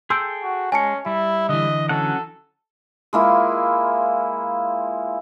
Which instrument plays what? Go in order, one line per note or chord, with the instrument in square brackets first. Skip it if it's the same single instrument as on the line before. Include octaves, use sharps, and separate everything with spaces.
[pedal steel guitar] G#4 A4 G5 [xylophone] C6 E6 G6
[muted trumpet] F#4
[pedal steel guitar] G#3 [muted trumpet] C#4 [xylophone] G#5 A5 C#7
[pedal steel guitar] G3 [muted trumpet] E4
[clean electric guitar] D3 E3 [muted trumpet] D#5
[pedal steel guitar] F#3 C#4 F#5 [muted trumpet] A4
[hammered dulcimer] G#3 A#3 E4 F4